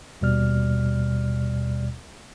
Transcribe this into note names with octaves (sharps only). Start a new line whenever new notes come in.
D#2 B2 G3 D5 F6